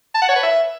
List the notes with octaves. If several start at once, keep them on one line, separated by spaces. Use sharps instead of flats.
A5
F#5
C#5
B4
E5